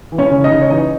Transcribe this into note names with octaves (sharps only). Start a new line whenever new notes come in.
E3
C#4 C#5
C#3
D#4 D#5
C#3
C#5
E3 D#4 D#5